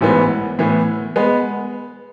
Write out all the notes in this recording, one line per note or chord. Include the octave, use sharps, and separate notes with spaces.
A1 G#2 E3 B3
A2 E3 B3
G#3 B3